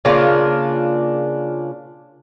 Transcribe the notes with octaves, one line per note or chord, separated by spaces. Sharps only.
C#3 A#3 D4 F4